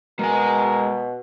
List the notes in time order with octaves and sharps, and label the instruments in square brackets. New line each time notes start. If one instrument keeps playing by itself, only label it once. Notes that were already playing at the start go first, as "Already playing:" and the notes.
[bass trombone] B2 [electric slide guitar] G#3 G#5 [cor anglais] A#4